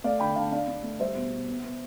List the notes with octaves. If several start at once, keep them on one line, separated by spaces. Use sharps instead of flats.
A3 D5 F5
D3 G5 B5
D3 F5 A5
D4 D5 F5
D4
A3
G3 C5 E5
B2
B2
B3
B3